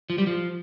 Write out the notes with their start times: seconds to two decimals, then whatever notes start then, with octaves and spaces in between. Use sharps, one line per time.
0.10 F3
0.18 G3
0.27 F3